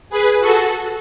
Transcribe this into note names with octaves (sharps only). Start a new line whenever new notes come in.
G#4 B4
F#4 A4